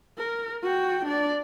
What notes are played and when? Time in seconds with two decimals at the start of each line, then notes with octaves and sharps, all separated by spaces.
0.18 A#4
0.64 F#4 G5
1.05 D4 D5